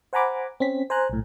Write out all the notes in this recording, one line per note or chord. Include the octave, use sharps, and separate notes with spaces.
C5 F#5 G#5 A#5 B5 D6
C4 C#4 B6
C5 G#5 A#5 F#6
B1 A2